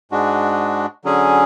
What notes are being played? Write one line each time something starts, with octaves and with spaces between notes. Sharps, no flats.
G#2 G#3 D4 F#4
D3 F#3 C#4 G#4